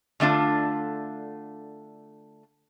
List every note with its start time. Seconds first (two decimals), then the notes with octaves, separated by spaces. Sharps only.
0.20 D3 A3 D4 F4